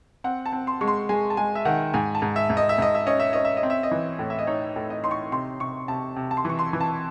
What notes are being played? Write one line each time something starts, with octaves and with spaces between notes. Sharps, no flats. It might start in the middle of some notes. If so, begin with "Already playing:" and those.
C4 F#5
A5
C4
C6
G#3 C#6
C6
G#3 G#5
A5
G#3 G#5
E5
D#3 F#5
G#2 G#5
A5
G#2
E5
G#2
D#5
E5
G#2 D#5
E5
C#4 D#5
E5
C#4 D#5
E5
D#5
C4
E5
D#5
E3
A2
E5
D#5
D#4 C#5
A2
D#5
D#4 C6
C#6
C3 C6
C3 C#6
C3 A5
C3
A5
C6
E3 C#6
C6
E3
A5